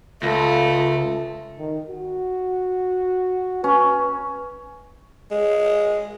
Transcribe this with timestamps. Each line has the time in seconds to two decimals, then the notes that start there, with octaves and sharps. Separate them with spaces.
0.23 C#2 A3 F4
1.59 D#3
1.89 F#4
3.64 C#4 B4
5.31 G#3